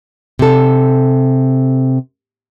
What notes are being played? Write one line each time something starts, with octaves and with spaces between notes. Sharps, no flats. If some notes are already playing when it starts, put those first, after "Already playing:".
C3 A4